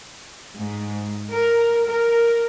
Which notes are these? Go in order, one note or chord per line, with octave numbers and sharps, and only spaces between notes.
G#2
A#4
A#4